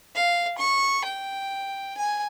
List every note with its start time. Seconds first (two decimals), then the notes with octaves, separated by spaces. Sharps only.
0.15 F5
0.58 C#6
1.05 G5
1.97 G#5